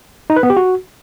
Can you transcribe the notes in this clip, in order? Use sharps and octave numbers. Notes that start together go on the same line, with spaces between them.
D#4
B4
B3
G4
F#4